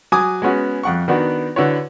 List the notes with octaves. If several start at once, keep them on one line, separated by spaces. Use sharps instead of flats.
F#3 G#5 D6 D#6
G#3 B3 C#4 F#4
F2 F#5 C#6
D#3 B3 D4 F#4
D3 E4 F#4 B4 C#5